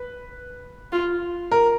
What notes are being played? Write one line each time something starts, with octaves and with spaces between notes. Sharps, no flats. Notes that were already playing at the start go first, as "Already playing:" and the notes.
Already playing: B4
F4
A#4